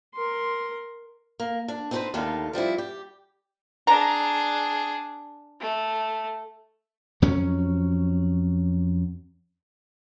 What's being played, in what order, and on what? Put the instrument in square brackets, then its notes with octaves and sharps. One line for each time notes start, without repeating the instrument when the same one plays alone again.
[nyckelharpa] A#4 C6
[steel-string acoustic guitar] A#3
D4
C4 D#4 E4 F#4 B4 C5
D#2 D3 D#3 A3 A4 F5
F3 G3 C4 E4
G4
[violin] D4 G#4 [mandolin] A#5
[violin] A3
[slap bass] F2 F#3 C#4